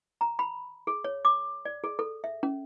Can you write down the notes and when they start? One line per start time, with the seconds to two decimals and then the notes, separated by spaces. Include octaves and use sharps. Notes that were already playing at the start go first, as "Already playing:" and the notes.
0.21 A#5
0.39 B5
0.87 G#4
1.04 C#5
1.25 D6
1.65 D5
1.84 G#4
1.99 A4
2.24 E5
2.43 C#4